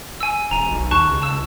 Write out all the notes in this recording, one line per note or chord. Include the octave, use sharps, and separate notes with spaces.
G#5 E6
D#1 G#5 A#5
B1
D#2 A5 C#6 F#6
C#2
A5 E6